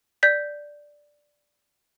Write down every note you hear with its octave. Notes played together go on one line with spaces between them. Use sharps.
D5 G6 B6